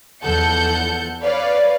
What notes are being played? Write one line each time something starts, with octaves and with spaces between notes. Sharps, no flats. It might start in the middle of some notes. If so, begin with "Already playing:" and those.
E2 F3 A4 F#5 G6 C#7
B4 C#5 D5 F5